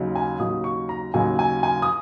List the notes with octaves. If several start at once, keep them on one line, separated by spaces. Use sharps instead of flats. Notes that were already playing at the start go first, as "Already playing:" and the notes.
Already playing: D#2 C#3 F#3 D#4
G#5
D#2 C#3 F#3 D#4 D#6
C#6
A#5
D#2 C#3 F#3 D#4 G#5
G#5
G#5
D#6